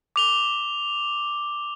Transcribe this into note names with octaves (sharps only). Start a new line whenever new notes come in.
D6 F7 G7